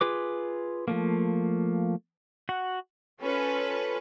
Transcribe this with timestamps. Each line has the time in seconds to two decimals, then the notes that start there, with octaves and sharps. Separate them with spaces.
0.01 F4 G#4 B4 D6
0.88 F3 A3 A#3
2.49 F#4 F#5
3.20 C#4 F4 A4 B4